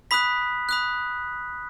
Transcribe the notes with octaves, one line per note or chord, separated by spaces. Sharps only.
B5 D#6 F#6 B6
B5 D#6 F#6